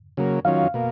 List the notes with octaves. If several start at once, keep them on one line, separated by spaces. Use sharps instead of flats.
C#3 F#3 A#3
D#3 F#3 C#4 F4 F5
B2 A#3